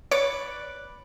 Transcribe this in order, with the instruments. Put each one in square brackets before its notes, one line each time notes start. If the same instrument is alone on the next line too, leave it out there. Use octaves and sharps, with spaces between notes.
[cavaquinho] B4 D5 D6 [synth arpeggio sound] C#5